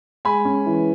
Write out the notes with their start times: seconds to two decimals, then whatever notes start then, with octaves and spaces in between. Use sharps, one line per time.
0.25 G#3 G#5 B5
0.45 C#4
0.66 E3